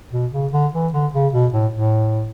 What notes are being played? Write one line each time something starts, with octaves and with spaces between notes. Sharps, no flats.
B2
C#3
D3
E3
D3
C#3
B2
A2
A2